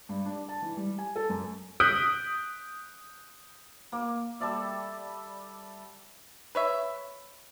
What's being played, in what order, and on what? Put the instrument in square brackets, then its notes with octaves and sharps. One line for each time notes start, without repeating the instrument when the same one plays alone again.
[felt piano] G2
D4
A5
E3
G3
G#5
A4
F#2
[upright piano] D#6 F#6 G6 B6 D7
[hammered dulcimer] A#3 D6
G3 A4 D5 E5
[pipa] B4 C#5 E5